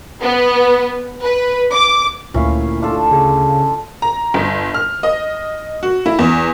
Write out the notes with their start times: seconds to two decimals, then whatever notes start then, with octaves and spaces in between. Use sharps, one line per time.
0.21 B3
1.22 B4
1.72 D6
2.34 D2 A#2 C#4 E4 F5
2.82 D4 F4 A4
3.11 C#3
4.02 A#5
4.34 G1
4.74 F6
5.03 D#5
5.83 F#4
6.06 E4
6.19 E2